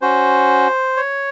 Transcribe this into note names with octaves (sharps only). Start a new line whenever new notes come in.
C#4 F#4 C5
C#5